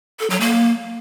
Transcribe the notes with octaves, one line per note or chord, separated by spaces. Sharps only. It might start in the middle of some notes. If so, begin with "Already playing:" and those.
A4
F#3
A#3